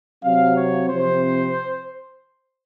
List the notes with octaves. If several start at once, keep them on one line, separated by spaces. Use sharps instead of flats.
C3 F#3 C4 F5
C#5
C3 F3 C4 C5